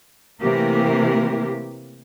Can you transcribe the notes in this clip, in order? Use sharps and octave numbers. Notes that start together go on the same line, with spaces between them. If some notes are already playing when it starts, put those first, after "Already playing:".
C3 E3 A3 A#3 G4 A#4